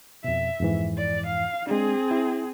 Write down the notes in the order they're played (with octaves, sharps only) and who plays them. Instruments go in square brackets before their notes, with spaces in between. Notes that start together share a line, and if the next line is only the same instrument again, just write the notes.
[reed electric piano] F2 B2 [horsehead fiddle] E5
[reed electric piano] F2 G#2 E3
[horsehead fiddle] D5
F5
[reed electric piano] G#3 D4 [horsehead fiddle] C4 G#4
[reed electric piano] E4